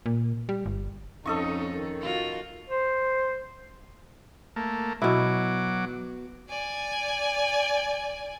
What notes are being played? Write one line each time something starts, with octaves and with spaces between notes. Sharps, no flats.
A#2
G3
G1
F2 C#4 D#4 A4 D#5 C#6
D#3
F4 F#4
C5
A3 A#3
B2 F#3 E4 D6
D5 G#5